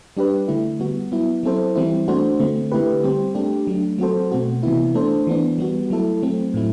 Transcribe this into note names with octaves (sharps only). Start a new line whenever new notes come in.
G3 D4 G4 B4
D3 A3 E4
G3 B3 F#4
F#3 B3 E4
F#3 C4 E4 A4 C5
E3 G3 C4 E4
A3 D4 F#4 C5
D3 A3 C4
D3 A3 E4 G4 B4
G3 C4 G4 C5
A3 D4 G4
F#3 A3 D4
F#3 C4 F#4 A4 C5
B2 A3 C4 F#4
C3 E3 B3 E4
A3 D4 A4 C5
E3 B3 D4
G3 B3 F#4
F#3 A3 E4 A4
F#3 A3 C4
A2 F#3 A3 E4